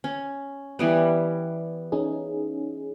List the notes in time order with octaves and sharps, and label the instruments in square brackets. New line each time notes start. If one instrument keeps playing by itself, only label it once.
[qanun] C#4
E3 G3 B3
[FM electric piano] C#4 D#4 G#4